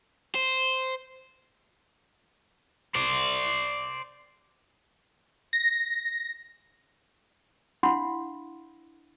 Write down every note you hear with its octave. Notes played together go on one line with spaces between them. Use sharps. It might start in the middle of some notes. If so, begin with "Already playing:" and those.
C5
C5 D5
A#6
D4 E4 F5 F#5 B5 C6